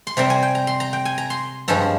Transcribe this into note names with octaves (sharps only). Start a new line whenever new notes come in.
C6
C3 G3 C4 A#5
G#5
G5
A#5
C6
A#5
G5
G#5
A#5
C6
G2 F3 G#3 C#4 A#5